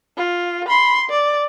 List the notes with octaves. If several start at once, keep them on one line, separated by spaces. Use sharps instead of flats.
F4
B5 C6
D5